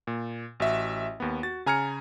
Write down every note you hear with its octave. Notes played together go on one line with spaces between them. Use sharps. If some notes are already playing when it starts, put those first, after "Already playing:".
A#2
A1 F#4 E5
D#2 B3
F#4 A6
C#3 G#5 A#5 F6 G#6 C#7